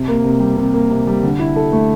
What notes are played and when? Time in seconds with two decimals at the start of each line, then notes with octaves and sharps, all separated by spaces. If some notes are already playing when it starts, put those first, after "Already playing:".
Already playing: C3
0.08 A#3
0.24 C3
0.40 G3
0.57 C3
0.74 A#3
0.90 C3
1.07 G3
1.23 D3
1.39 E4
1.56 A4
1.72 A3